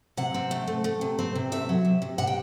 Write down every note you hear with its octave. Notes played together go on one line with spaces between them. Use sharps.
C3 F#5
C4
A3
A3
A3
C3
C4
C3
A3 E5
F#3
C3
C3
C3 F#5
G5